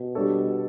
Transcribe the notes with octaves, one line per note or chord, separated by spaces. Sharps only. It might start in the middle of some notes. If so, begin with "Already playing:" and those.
Already playing: B2
G3 D4 A4 C#5